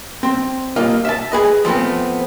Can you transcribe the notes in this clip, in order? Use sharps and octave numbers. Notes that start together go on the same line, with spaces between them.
C4
C2 A#3 F4 D#5
E5 A5
G#4 B4 D#5
F3 A3 B3 C4